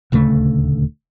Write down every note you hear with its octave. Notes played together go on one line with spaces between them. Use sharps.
D#1 D2 C#3 A3